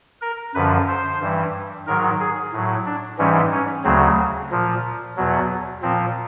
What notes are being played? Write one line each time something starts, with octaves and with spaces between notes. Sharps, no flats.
A#4
F#2 D3 F3 B4
C5
G2 E3 G3
G#2 D#3 F#3 A#4
G#4
A2 F#3
D4
G#2 E3 G3 C#4
C#4
D2 C#3 F#3 C4
A#2 F3
E2 B2 F#3
A#2 F3 C4